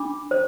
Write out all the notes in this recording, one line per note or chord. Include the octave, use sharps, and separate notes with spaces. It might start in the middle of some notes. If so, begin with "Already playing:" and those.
Already playing: D4 B5 D6
C5